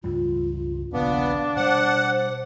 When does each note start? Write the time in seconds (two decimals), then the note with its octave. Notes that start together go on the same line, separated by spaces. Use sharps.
0.04 C#2 G2 G3 F4
0.93 D#1 A#1 C#3 B3 D4 F5
1.56 B2 G3 C5 F#5